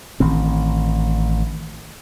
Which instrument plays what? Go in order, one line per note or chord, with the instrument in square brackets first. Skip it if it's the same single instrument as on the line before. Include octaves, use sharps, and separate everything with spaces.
[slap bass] A1 D#3 C4